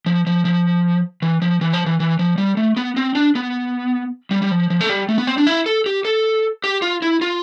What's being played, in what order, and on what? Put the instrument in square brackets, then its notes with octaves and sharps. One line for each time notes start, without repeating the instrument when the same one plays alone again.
[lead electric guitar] F3
F3
F3
E3
F3
E3
F3
E3
E3
F3
G3
A3
B3
C4
D4
B3
G3
G3
F3
F3
A3
G3
A3
B3
C4
D4
E4
A4
G4
A4
G4
F4
E4
F4